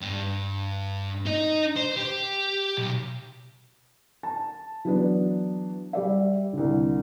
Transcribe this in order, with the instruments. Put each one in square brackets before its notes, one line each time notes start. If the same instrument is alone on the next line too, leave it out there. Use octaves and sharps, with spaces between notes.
[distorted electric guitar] G2
D#4 D#5
C5
G4
B1
[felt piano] A5
E3 F#3 B3 D4
G3 D5 E5
C2 D3